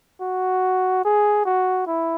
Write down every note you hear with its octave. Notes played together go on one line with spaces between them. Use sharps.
F#4
G#4
F#4
E4